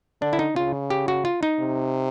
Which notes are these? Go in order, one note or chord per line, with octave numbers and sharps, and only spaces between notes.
D3 D4
E4
D#4
C#3 F4
G4
F#4
F4
D#4
C3